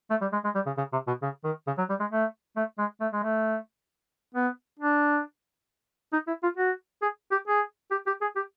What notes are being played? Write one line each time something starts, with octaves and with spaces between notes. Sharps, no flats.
A3
G3
G#3
G#3
G3
C#3
C#3
C3
B2
C#3
D#3
C#3
F#3
G3
G#3
A3
A3
G#3
A3
G#3
A3
B3
D4
D#4
E4
F4
F#4
G#4
G4
G#4
G4
G4
G#4
G4